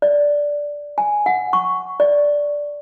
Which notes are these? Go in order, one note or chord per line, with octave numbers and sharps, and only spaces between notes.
D5
G#5
F#5
C#6
D5